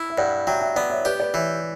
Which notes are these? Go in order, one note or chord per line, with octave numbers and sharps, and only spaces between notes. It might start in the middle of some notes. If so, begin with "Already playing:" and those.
Already playing: E4
E5
G2 D5 F#5
F#3 E5 G5
E5 G5
B3 D5 F#5
C#5 E5
G4 B4 D5
B4 D5
E3 C#5 E5